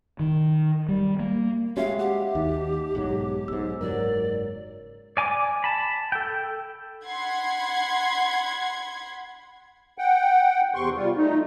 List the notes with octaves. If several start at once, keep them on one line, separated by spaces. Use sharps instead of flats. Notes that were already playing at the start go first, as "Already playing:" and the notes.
D#3
G3
A#3
G#3 C#4 F#4 G4 E5 F5
G4 F#5
D#2 D#4
B1 G#2 F#3
B1 G#2 E6
F#1 G#2 F#3 A#4 D5
D5 G#5 D6
A5 B5
A4 G5
F#5 B5 C6 G#6
F#5 G5
E2 C3 C6 C#6
G3 F4
A3 D#4